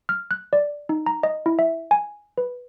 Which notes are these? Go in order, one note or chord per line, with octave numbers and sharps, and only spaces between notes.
F6
F#6
D5
D#4
A#5
D#5
E4
E5
G#5
B4